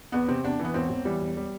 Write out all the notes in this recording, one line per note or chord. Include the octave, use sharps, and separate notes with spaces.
E2 B3
C3 C4
E2 D4
E3
B3
E1 C4
E1
E3 G3
E1
G3